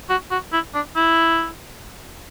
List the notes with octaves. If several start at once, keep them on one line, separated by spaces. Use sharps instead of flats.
F#4
F#4
E4
D4
E4